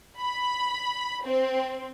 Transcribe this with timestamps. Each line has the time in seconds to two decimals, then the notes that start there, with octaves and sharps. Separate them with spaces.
0.20 B5
1.25 C4